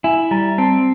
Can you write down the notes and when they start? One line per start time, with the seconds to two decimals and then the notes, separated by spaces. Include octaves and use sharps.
0.04 E4 G#5
0.31 G3 A#5
0.58 C4 A5